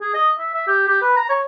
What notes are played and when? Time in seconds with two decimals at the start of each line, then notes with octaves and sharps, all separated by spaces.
0.01 G#4
0.14 D#5
0.38 E5
0.54 E5
0.68 G4
0.88 G4
1.02 B4
1.17 A#5
1.30 C#5